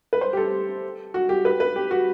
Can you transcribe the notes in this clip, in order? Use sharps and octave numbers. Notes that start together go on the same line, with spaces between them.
B4
C5
G4
A4
F#4
G4
B4
B4
G4
F#4